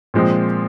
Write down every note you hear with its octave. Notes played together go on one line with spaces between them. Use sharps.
A#2 F3 G#3 C4